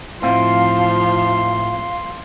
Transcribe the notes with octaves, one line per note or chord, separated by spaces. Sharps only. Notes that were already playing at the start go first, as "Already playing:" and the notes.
A2 F3 C4 F5 C6